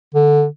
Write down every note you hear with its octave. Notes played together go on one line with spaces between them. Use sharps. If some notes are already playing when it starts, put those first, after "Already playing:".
D3